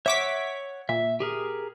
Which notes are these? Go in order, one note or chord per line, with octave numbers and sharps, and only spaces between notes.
C#5 E5 F#5 C#6 D6 B6
A#2 E5
G4 G#4 A#4